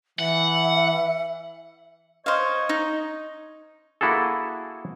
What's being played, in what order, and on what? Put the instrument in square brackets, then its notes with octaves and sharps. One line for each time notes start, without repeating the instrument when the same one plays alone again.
[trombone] E3 [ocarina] E5 [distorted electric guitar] F#5
[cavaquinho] C5 F5 [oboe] C#5 [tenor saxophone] D#5
[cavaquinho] D#4
[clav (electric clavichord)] A#3 E4 F#4 G#4 A4